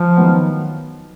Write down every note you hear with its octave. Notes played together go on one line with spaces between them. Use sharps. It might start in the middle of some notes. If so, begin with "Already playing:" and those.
Already playing: F3
D#3 F#3 B3